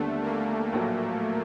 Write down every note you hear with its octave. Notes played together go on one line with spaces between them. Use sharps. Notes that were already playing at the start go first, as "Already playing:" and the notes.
Already playing: D#2 D3 G3 A3 B3 D4
A#3
A#1 A2 F#3 A#3